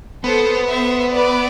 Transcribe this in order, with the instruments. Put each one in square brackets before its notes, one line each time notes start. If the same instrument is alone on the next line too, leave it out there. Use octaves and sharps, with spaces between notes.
[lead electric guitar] B3 [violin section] A4 C5
[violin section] C5 E5
B4 D5